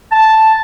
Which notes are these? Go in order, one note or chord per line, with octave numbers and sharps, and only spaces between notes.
A5